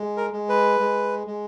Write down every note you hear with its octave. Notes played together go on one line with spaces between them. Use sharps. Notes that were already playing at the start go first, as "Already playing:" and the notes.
Already playing: G#3
A#4
G#3
B4
G#3
G#3